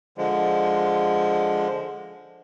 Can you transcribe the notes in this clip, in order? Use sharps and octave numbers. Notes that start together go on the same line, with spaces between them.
D3 F3 G#3